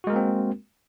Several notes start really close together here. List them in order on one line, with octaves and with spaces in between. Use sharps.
F#4 G#3 A#4 A#3 C4